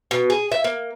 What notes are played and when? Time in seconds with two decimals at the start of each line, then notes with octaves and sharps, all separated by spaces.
0.11 B2
0.30 G#4
0.52 E5
0.64 A#3